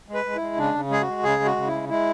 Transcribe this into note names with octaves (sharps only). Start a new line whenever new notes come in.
G#3
B4
G#3
E4
G#3
C#3 D4
C#3
G#3 G#4
F#4
G#3
C#3 G#4
G#3
F#4
C#3
E4
G#3
G#3 E4